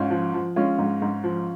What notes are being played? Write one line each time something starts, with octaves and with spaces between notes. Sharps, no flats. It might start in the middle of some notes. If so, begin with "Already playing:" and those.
Already playing: G#2 C#4 F4
F3
F3
G#3 C#4 F4
G#2
G#2
F3